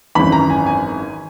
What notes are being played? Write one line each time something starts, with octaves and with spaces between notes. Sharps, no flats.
G#1 F#2 E3 B5
A#5
G#5
G#5